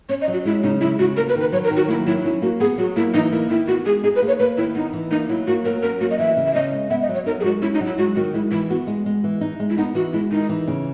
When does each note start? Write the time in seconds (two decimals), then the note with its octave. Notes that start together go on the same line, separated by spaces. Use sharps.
0.09 C#4 C#5
0.22 D#5
0.28 F#3
0.33 F#4
0.45 G#3 E4
0.63 C#3 D#4
0.81 G#3 E4
0.99 C#3 F#4
1.17 A#3 A#4
1.29 B4
1.35 D#3
1.41 B4
1.53 F#3 C#5
1.64 A#4
1.71 D#3
1.77 F#4
1.88 A#3 E4
2.07 F#3 E4
2.25 C#4 E4
2.42 A#3 F#4
2.60 B3 G#4
2.78 F#3 F#4
2.96 A#3 E4
3.14 E3 D#4
3.32 A#3 E4
3.50 D#3 E4
3.68 B3 F#4
3.86 G#3 G#4
4.04 D#4 G#4
4.16 B4
4.22 A#3
4.28 C#5
4.40 A#3 B4
4.57 D#3 E4
4.75 B3 D#4
4.93 E3
5.11 A#3 D#4
5.29 F#3 E4
5.47 A#3 F#4
5.65 F#3 A#4
5.83 C#4 A#4
6.01 A#3 F#4
6.10 D#5
6.19 E3 E5
6.37 C#3
6.46 E5
6.54 C#4 D#5
6.72 G#3
6.90 B3 E5
7.02 D#5
7.09 F#3
7.14 C#5
7.26 D#4 A#4
7.40 G#4
7.44 G#3 F#4
7.62 C#4 E4
7.74 D#4
7.80 F#3
7.86 E4
7.98 G#3 F#4
8.16 D#3 F#4
8.34 G#3 E4
8.51 E3 E4
8.70 B3 F#4
8.87 G#3
9.06 G#3
9.24 E3
9.41 D#4
9.60 G#3
9.70 E4
9.77 B3 D#4
9.95 E3 F#4
10.13 G#3 E4
10.31 D#3 D#4
10.49 E3
10.68 C#3